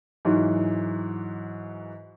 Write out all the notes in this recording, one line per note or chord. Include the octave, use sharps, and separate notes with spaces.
G#2 E3 F#3